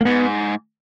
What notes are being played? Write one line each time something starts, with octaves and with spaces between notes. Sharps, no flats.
A#3
G#2 B3